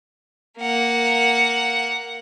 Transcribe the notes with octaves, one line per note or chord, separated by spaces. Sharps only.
A#3 F#5